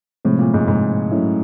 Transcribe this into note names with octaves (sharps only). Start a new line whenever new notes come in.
A2 C3 F3 G#3 C4
A#2
G#2
G#2
F#3 A3 C#4 E4